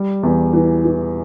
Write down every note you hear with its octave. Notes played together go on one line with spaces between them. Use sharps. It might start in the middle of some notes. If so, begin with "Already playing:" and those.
Already playing: G3
E2
E3
E3